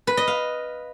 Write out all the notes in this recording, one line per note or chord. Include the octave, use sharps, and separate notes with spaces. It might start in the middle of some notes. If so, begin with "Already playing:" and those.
B4
D#5
F5